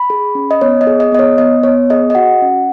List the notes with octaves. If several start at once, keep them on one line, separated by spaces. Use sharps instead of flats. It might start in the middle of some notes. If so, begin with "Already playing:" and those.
Already playing: B5
G#4
C#4
D#5
B3 C#5
D#5
G#4
D#5
B3 D#5
C#5
B3 D#5
B3 C#5
G#4 D#5
D#5
F#4 F#5
C#4